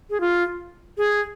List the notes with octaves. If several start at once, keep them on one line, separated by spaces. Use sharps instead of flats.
G#4
F4
G#4